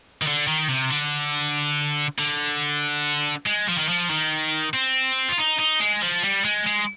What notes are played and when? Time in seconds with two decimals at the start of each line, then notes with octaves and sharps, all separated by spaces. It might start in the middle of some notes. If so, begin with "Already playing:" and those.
0.22 D#3
0.27 D3
0.47 D#3
0.69 C3
0.91 D3
2.18 D3
3.46 G#3
3.68 F3
3.78 D#3
3.89 F3
4.10 D#3
4.74 C4
5.29 F4
5.38 D#4
5.59 D#4
5.81 G#3
6.02 F3
6.23 G3
6.45 G#3
6.66 G#3